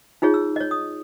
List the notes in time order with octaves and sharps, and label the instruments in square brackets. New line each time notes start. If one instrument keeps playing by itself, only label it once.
[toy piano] D#4 F4 G#4 C#5
E6
C#5 D#5
D#6